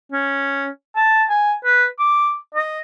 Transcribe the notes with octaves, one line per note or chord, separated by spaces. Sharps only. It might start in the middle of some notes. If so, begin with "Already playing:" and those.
C#4
A5
G#5
B4
D6
D#5